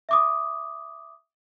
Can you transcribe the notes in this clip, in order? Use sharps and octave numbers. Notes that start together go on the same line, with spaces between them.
E5 D6 D#6